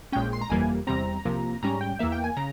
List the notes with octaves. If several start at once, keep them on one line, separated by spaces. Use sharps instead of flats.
A#1 A#2 G#3 C#4 G5
C6
A#5
G1 F2 E3 G3 A#3 G#5
E2 C3 G3 C4 A#5
C2 C3 F3 A#3
G#2 G3 C#4 A#5
G5
E2 E3 A#3 E5
G5
G#5
C#3 A#5